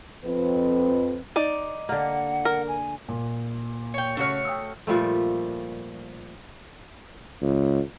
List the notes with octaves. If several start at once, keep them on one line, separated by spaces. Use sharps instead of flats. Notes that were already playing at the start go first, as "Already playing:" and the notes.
F2 C4 B4
D#4 D5
D3 A#3 F#5
A#4
G#5
A#2
C#5 G5
C#3 A3 F#4 C#5 F6
G5 D#6 E6
A#2 F3 G3 A3
C#2